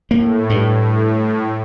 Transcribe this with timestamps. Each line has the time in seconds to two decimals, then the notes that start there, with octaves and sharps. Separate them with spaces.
0.11 A2 A#3
0.50 G2